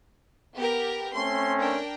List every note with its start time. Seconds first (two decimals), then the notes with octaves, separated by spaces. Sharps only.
0.56 B3 G4 A#4
1.14 A3 C4 C#4 C6
1.58 D4 A#4 G5